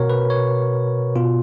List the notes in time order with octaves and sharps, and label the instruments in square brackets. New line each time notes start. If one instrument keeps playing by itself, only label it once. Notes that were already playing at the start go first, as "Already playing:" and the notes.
Already playing: [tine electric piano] B2 F#4 A#4 C#5
B4
C#5
B2 F4